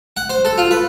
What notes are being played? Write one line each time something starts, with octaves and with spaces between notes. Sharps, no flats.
F#5
C5
A4
F4
B4